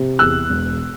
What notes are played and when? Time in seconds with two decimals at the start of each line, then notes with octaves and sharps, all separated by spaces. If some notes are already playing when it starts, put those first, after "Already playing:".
Already playing: C3
0.19 E2 E6 F#6
0.50 E1